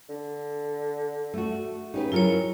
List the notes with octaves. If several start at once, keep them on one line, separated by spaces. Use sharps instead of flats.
D3
A3 F#4
C#3 D#4 G4 B4
F#3 E4 F4 A#4 C#5